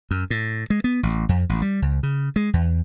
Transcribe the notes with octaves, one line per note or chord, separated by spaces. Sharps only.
F#2
A2
G#3
B3
A1
F2
A1
G3
C#2
C#3
G#3
E2